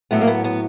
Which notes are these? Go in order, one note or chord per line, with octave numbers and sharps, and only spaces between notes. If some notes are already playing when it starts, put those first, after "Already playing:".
A2 F#3 A3 B3
A#3
B3
B3